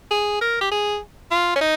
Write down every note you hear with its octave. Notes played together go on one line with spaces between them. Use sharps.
G#4
A#4
G4
G#4
F4
C#4
D#4